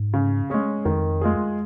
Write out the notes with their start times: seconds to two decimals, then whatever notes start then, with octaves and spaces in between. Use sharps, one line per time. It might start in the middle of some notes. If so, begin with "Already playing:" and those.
Already playing: G#2
0.13 C#3
0.50 G#3 C#4 G#4
0.85 F2 D#3
1.21 G#3 F4 G#4